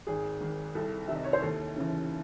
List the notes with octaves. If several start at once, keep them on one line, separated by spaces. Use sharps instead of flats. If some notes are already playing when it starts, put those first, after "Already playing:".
G#1 G#4
G#2 D#3
C2 A4
C3 D#3 E5
D#5
C#5
C5
D#2 A4
C#3 E3